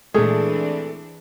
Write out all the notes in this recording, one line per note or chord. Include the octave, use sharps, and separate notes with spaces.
A#2 E3 G#3 A3 C4 D4 G#4